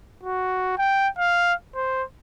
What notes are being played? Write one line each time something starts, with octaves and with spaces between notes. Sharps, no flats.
F#4
G5
F5
C5